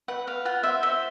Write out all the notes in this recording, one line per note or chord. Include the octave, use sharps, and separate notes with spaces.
B4 F#5
B4 F5
F4 F#5
C5 E5
C5 E5